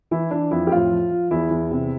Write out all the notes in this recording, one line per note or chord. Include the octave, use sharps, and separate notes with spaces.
E3 E4
E3 D4
F2 E4
G4
A2 F4
F3
F3
E2 E4
E2
C3